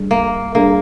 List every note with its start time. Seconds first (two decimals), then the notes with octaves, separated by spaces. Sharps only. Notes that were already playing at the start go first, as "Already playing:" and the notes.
Already playing: G3 D4 G#4
0.11 A#3
0.55 G3 A#3 D4 G#4